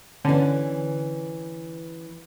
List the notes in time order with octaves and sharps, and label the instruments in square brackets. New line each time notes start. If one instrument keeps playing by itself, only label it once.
[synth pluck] D3 [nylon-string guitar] E3 C#4